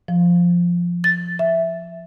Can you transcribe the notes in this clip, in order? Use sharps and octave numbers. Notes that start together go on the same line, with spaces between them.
F3
A6
E5